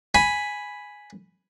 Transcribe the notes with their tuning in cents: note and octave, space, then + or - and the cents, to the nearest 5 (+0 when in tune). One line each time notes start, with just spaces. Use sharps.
G#5 +0 B5 +0